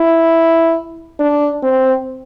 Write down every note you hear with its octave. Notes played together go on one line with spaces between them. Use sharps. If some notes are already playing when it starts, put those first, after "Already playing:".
Already playing: E4
D4
C4